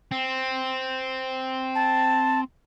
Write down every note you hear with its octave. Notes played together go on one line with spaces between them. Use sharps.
C4
A5